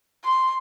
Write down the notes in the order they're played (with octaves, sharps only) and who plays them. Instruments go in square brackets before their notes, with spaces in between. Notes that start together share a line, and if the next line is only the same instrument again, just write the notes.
[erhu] C6